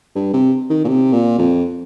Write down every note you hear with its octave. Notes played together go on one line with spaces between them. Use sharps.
G2
C3
D#3
A#2
C3
A#2
F2